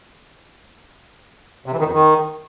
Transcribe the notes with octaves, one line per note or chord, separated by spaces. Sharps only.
C3
E3
D#3
F2
D#3